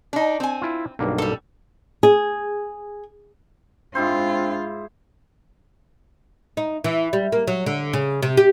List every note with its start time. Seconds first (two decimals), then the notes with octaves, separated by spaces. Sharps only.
0.13 D4 D#4
0.40 C4 G#5
0.61 E4 F4
0.99 B1 G2 A#3
1.18 G3 A4
2.03 G#4
3.95 G#2 C4 D4 E4 F4 C5
6.57 D#4
6.84 E3
7.13 G3
7.32 A#3
7.47 F#3
7.66 D3
7.93 C#3
8.23 C3
8.37 G4